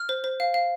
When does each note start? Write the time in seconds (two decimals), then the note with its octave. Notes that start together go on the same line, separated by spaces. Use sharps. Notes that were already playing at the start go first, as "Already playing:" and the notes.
Already playing: F6
0.09 C5
0.24 C5
0.40 F5
0.54 F5